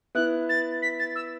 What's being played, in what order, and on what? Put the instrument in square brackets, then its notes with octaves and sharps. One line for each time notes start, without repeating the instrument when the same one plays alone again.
[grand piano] B3 E4 [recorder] F#6
[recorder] A6
B6
A6
E6